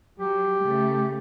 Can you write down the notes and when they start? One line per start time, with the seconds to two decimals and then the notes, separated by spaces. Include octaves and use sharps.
0.20 F#3 G4
0.62 C#3 A3